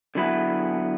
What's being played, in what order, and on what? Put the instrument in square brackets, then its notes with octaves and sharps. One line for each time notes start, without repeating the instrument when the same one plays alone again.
[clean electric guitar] D3 F#3 B3 E4 B4